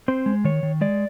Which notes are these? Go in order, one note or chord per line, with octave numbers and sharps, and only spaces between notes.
C4 C5
G#3
D#3 C#5
D#3
G#3 D5